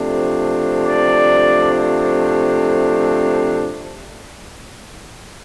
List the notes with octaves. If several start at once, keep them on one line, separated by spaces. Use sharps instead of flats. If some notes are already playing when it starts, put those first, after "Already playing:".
Already playing: C3 F3 A3 D4
D5